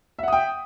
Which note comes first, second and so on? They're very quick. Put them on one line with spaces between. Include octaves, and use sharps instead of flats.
E5 F#5 D#6 G5